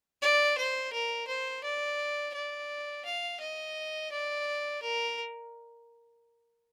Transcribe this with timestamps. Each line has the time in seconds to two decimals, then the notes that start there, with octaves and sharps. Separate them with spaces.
0.22 D5
0.58 C5
0.93 A#4
1.28 C5
1.64 D5
2.34 D5
3.05 F5
3.41 D#5
4.12 D5
4.82 A#4